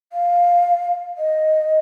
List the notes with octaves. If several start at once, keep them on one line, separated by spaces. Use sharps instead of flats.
F5
D#5